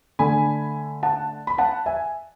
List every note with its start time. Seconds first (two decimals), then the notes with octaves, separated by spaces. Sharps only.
0.19 D3 A3 G#5 B5
1.03 F#5 A5
1.47 B5
1.58 F#5 A5
1.86 E5 G#5